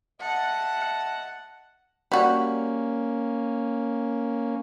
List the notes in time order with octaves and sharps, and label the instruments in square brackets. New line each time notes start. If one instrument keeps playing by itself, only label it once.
[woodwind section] D#5 E5 A5 [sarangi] F#5
[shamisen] G3 F#4 [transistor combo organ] A#3 C#4